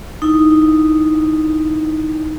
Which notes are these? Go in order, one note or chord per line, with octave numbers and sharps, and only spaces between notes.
D#4 E4